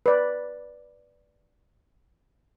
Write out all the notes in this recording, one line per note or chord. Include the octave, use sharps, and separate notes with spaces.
B4 D5